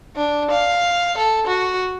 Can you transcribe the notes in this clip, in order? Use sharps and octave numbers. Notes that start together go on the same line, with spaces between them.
D4
F5
A4
F#4